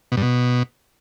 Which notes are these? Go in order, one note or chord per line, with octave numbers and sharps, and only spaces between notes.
B2
G2
B2